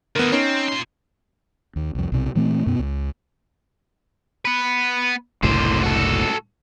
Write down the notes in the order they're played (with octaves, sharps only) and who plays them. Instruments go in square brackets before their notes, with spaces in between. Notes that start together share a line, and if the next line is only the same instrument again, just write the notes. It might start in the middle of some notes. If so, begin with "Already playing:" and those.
[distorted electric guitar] D2 E3 [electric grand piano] B3 A#4
[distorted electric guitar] C4 [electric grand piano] C#4 D#4
[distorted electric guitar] A#2 C6
[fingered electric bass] D#2
C2 F2
B1 C3
A#2 E3 A3 C4
F#2 B2 B3
C#2
[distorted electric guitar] B3 B4
[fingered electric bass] F#1 C2 A2 [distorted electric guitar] D3 C5
[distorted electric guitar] F#4 A4